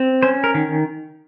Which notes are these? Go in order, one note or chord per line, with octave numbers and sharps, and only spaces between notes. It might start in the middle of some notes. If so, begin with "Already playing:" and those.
Already playing: C4
C#4 C5
A#4
D#3